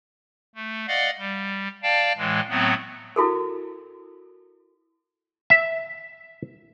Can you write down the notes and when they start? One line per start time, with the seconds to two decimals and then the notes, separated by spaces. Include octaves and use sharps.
0.55 A3
0.87 D5 D#5 F5 F#5
1.18 G3
1.83 D5 F5 G5 A5
2.17 A2 E3 G#3
2.50 A2 F#3 A3 B3 C4
3.16 E4 F#4 A4 A#4
5.50 E5